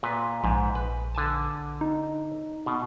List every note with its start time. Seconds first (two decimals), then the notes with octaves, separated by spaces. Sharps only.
0.03 A#2 B4
0.44 A#1 G#2
0.75 B4
1.15 D3 G#5 A5
1.81 D#4
2.66 B2